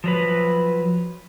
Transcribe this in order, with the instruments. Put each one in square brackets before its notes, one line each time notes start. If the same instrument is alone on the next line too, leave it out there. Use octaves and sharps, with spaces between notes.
[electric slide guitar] F3 F#3 B4